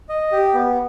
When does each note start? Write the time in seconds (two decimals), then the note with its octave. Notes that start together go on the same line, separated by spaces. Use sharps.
0.09 D#5
0.32 G4
0.54 B3